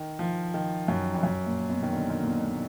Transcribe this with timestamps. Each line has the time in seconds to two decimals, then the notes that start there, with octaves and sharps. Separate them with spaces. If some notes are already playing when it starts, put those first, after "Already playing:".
Already playing: D#3
0.19 F3
0.54 D#3
0.88 F#2
1.14 F2
1.23 F#2
1.46 A#2
1.69 B2
1.83 D#3
1.93 D3
2.10 D#3
2.21 A#2
2.27 B2
2.44 A#2